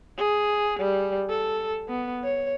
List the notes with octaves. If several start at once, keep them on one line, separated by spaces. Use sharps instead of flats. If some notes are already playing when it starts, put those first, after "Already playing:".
G#4
G3
A4
B3
C#5